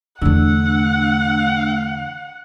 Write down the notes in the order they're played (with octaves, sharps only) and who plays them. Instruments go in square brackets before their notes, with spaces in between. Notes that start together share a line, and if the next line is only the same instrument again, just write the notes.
[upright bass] E2 D3 [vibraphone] A3 D4 E6 [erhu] F#5